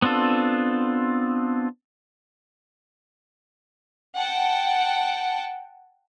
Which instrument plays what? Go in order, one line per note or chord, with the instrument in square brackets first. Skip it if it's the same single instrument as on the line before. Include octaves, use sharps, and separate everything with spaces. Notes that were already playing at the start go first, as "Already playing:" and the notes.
[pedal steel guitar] B3 C4 D4 F4 A4
[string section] F#5 G5 A5